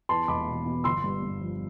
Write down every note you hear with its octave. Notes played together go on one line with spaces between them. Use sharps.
E2 A5 C6
E1 B5 D6
B2
B2
G1 C6 E6
G2
G2
F3